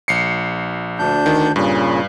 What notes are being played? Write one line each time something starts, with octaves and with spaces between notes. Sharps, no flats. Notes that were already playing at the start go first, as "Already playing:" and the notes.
A#1 C7 C#7
D2 D4 G6
D#3
G2 A#2 C#3